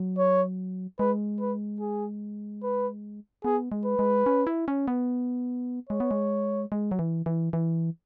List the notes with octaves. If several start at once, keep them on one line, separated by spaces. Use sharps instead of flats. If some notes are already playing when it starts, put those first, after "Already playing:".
Already playing: F#3
C#5
G#3 B4
B4
G#4
B4
B3 G#4
G#3
B4
G#3
C#4
E4
C#4
B3
G#3 C#5
B3
G#3
G#3
F#3
E3
E3
E3